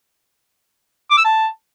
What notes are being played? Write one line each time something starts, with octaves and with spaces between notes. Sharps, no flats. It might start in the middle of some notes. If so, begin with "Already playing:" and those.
D6
E6
A5